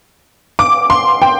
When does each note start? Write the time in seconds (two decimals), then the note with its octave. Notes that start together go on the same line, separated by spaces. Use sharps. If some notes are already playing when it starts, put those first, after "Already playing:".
0.59 D6
0.90 C6
1.22 G5